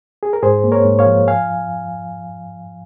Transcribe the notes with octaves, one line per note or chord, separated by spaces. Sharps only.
G#4
A#4
G#2 G#4 C5
A#3
A#4 C#5
G#2
C#5 F5
F3
F5 G#5